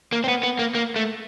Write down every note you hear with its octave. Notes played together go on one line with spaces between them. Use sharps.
A#3
C4
B3
B3
A#3
A#3
A3